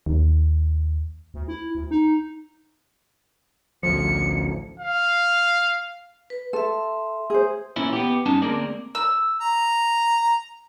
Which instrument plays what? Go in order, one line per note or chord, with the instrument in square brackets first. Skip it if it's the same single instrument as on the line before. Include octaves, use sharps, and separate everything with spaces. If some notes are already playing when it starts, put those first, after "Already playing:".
[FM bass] D#2
D2
E4
D2
D#4
[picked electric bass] A1 D2 F3 [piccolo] C#7
[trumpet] F5
[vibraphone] B4
[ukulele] A4 [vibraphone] E5 C6
[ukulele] G#4 C5
[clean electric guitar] A#2 E3 C#4 E4
B3 G4
G2 C#4 D#4 A5
D2 G#3 A#3 C4 A#4 D5
[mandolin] E6
[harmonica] A#5